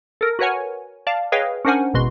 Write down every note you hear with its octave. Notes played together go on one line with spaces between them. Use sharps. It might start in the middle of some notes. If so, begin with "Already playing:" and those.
A4 A#4
F#4 A#4 B4 C#5 F#5 G#5
D5 F5 A5
G#4 B4 C#5 D#5 F5 G5
C#4 D4 A#4 C5 F#5 G#5
G#1 E2 B2 F#4 C6